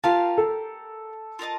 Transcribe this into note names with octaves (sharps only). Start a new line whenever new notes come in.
F4 G4 A#4 F5 A5
A4
F4 A#4 D#5 A5